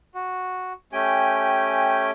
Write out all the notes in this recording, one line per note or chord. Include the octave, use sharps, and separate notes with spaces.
F#4
A3 C#4 G4 G5 G#5